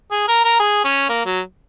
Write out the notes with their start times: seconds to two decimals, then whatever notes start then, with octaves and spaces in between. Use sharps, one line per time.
0.11 G#4
0.28 A#4
0.44 A#4
0.60 G#4
0.85 C#4
1.09 A#3
1.25 F#3